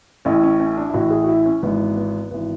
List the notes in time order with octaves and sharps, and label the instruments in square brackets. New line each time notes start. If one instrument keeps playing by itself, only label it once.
[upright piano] A1 A2 E3 C#4
C#4
C#4
D4
E4
A1 A2 E3 F#4
G#4
F#4
E4
C#4
G#1 G#2 E3 B3
B3
G#1 E3 B3